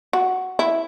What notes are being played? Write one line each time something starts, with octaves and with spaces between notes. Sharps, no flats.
F#4
E4